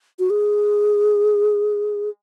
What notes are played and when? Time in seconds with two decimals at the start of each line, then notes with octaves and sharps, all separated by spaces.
0.19 F#4
0.30 G#4